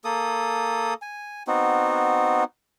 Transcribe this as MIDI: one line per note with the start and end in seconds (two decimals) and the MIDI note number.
0.04 0.94 58
0.04 0.94 69
0.04 0.94 87
1.02 1.43 80
1.47 2.44 59
1.47 2.44 60
1.47 2.44 63
1.47 2.44 66